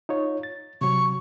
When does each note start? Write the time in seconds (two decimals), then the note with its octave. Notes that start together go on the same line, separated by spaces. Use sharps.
0.09 D#4 F4 C#5
0.43 A6
0.81 C3 F#3 C#6